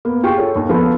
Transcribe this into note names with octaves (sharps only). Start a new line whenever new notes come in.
A#3 B3
F4 G4 G#4 G5 C#6
A4 C#5
D#2
F3 B3 A4